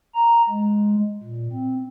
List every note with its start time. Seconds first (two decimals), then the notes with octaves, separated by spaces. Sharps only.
0.15 A#5
0.50 G#3
1.23 A#2
1.53 C4